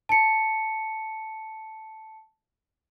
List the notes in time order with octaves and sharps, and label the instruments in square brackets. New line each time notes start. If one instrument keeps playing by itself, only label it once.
[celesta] A5 C#7